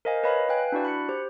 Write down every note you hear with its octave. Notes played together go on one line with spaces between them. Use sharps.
A#4 C5 D#5 F5 G#5
B4 C#5 D#5 F5 B5
B4 F5 G5 G#5 F#6
D4 E4 F#4 D5
B5 F#6 C#7
G4 C5